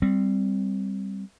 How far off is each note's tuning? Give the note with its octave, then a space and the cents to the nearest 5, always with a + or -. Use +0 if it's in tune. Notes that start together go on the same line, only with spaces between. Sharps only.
G3 +0 C4 +0